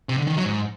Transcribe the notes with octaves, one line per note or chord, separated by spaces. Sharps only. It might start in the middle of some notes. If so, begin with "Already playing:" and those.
C3
D3
D#3
F#3
G#2